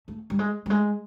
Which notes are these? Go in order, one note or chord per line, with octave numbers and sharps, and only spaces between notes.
A3
G3
G#3
G3
G#3